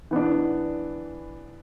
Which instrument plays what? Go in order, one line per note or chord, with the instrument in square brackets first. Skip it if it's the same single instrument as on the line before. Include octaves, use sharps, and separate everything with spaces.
[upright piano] E3 B3 D4